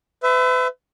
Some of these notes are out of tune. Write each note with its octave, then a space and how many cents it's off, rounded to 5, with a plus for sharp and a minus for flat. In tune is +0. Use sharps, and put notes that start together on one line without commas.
B4 +40 E5 +0